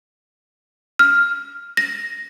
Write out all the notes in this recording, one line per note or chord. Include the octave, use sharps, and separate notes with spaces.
F6
A#6